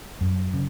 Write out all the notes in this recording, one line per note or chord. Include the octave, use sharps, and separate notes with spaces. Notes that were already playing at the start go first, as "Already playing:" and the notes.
F#2
C#3